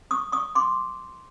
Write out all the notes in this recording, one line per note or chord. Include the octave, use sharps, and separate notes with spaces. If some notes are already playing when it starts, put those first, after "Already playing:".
C#6 D#6
C#6 D#6
C6 D6